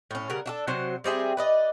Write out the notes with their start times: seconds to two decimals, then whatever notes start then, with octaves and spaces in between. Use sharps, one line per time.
0.11 A2 C#4
0.30 C#3 G3 A#4 F#5
0.46 D4 F#4 A4
0.67 C3 F#3 F#4 C5
1.04 G3 C4 G#4 E5
1.37 B4 D5 D#5